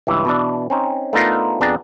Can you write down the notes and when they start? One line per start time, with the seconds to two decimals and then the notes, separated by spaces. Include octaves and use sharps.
0.07 C#2 G2 E3
0.25 B2 E3 D4
0.70 C4 C#4 D#4
1.13 A3 B3 D4 D#4 F4 A#4
1.61 F2 B3 D4 G#4 A#5